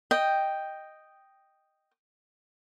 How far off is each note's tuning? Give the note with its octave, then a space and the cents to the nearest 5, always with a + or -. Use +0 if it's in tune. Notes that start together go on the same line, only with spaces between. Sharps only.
D#5 +0 G5 +0